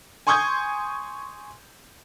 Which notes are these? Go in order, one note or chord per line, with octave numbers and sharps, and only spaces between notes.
G#5 C6 C#6 D#6 G6 G#6